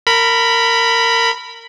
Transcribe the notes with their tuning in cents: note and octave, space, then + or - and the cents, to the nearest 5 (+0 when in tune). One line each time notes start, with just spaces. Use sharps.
A#4 -20 B5 +0